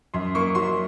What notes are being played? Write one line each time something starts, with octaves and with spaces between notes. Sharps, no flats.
F#2 C6
A#3 C#6
F#3 C6